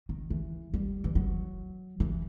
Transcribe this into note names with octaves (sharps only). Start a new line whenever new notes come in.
D#3
E3
G3
E3
F#3
E3